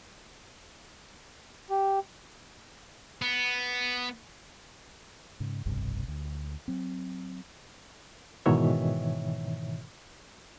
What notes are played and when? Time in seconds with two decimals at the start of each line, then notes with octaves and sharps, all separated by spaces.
1.70 G4
3.22 B3
5.40 G#2 C#3
5.65 F1 B1 G2 C3
6.08 D2
6.68 F#3 C4
8.46 G#2 B2 D#3 E3 C#5 E5